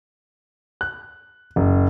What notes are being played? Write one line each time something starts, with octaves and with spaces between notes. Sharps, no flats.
F#6
F#1